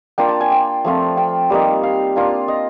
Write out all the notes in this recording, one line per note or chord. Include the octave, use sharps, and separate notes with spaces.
A#3 D4 F4 G5
A5
G#5
G5
F3 A3 C4 F4
G5
G3 A#3 D#4
F5
A#3 D4 F4
D#5